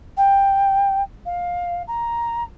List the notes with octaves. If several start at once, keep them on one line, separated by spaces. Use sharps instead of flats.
G5
F5
A#5